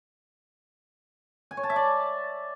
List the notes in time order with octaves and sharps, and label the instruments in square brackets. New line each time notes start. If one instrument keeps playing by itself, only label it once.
[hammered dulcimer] G#5
C#5
A5
E5
D5